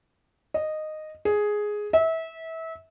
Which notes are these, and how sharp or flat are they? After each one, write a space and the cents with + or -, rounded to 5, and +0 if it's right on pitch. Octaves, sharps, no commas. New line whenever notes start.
D#5 -10
G#4 +5
E5 -25